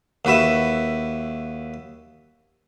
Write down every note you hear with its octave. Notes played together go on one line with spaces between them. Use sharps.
D#2 F#4 B4 E5